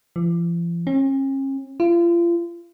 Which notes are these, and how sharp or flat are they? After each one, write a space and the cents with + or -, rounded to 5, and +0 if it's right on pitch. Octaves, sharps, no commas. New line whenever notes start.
F3 -45
C#4 -40
F4 -35